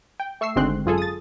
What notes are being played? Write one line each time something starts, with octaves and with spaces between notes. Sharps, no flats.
G5
A3 C#6 E6 C7
G#1 D3 G#3 C4 C6 F#6
F#2 F4 G#4 A4
D#6 A6